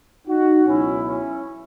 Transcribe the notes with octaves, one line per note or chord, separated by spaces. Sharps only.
D#4 F#4
C#2 B2 F#3 C#4 E4
C#4 E4